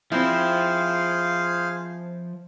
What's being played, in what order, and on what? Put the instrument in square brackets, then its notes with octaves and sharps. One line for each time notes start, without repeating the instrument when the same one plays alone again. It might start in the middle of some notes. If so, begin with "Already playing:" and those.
[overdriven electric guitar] F3 [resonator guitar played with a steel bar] C4 E4 [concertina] G#4 C5 F5